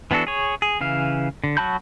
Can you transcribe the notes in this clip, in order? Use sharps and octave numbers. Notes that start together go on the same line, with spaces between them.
E3 B3 D4 F#4 A4
G#4 C#5
G#4
C#3 E3 F5
D3
F#3 F#4 A5 B5 G6